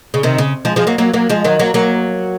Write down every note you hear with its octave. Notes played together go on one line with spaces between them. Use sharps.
C#3
C3 D#3
C#3
F3 G#3
F3 G#3
F#3 A#3
F#3 A#3
F#3 A#3
F3 G#3
D#3 F#3
F#3 A#3
F#3 A#3